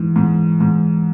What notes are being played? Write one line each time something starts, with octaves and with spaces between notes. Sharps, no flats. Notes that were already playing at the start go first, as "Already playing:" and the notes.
Already playing: G#2 E3
G#2
G#2